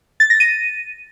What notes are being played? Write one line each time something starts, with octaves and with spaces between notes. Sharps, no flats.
A6
A#6
D#7